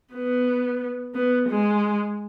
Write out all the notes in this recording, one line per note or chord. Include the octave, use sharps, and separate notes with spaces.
B3
B3
G#3